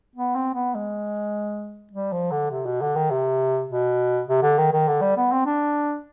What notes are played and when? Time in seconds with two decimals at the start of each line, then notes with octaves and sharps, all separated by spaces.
0.16 B3
0.35 C4
0.55 B3
0.75 G#3
1.93 G3
2.12 F3
2.31 D3
2.51 C3
2.66 B2
2.81 D3
2.96 D#3
3.11 C3
3.69 B2
4.28 C3
4.42 D3
4.58 D#3
4.72 D#3
4.88 D3
5.01 G3
5.17 B3
5.32 C4
5.46 D4